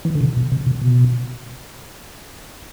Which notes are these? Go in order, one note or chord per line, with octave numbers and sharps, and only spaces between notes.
E3
D3
C3
B2
C3
C3
B2